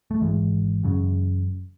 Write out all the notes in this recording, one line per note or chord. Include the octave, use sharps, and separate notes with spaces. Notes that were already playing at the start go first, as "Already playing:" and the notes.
A3
G#1 G#2 E3 G#3
F#1 F#2 C#3